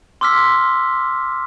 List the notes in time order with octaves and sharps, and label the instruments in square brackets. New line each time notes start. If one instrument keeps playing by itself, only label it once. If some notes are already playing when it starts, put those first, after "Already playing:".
[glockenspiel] C6 D6 E6 F6 B6